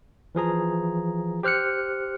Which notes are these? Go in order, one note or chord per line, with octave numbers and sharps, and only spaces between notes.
E3 F3 G#4 A#5
G4 C5 F6 F#6 C#7